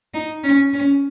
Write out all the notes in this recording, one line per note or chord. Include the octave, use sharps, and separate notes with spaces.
D#4
C#4
C#4